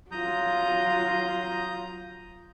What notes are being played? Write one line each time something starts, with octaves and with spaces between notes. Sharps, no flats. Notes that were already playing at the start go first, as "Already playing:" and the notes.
F#3 F4 A#5 D#6 G6